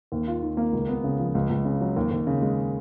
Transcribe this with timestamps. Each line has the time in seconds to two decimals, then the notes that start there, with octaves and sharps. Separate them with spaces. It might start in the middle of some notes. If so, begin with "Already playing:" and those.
0.12 D#2
0.28 F4
0.43 D#3
0.57 A#3
0.73 C#2
0.89 B3
1.04 C#3
1.20 F3
1.35 C#2
1.50 C#2
1.65 C#3
1.81 F#3
1.96 D#2
2.11 D#2
2.27 C#3
2.42 G#3